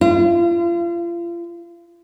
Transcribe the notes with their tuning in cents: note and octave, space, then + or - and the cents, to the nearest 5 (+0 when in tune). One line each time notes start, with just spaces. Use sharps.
F4 -35